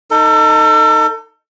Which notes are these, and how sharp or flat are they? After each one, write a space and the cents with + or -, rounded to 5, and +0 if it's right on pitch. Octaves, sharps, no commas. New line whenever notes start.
D#4 +0 A4 +35